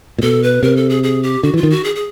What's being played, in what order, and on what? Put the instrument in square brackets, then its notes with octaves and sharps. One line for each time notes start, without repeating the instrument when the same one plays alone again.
[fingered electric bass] A#2
[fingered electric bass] B2 [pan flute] A4
[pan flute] B4
[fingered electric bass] C3 [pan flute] A#4
[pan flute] A4
G#4
G#4
G4
[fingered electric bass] D3 [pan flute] F#4
[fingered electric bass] E3 [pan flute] F4
[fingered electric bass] D#3
[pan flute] F#4
G#4
G#4